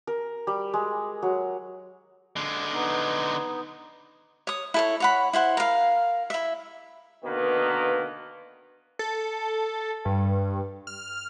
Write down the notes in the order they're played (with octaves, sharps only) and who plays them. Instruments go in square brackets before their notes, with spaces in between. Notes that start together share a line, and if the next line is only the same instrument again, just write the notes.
[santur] A#4
G3
G#3
F#3
[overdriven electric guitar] D3 G#3
[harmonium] B3 D#4
[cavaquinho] C#5 D#6
E4 A4 C#5
C#5 F#5 B5
E4 C5 F#5
A#4 F5
E4 E5
[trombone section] B2 D3 D#3 A#3 B4
[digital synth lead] A4
G2
F6